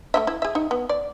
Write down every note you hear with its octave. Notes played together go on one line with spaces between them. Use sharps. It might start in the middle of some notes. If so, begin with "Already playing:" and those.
A3 C#4 E5
E4
G#4 E5
D#4
B3
D5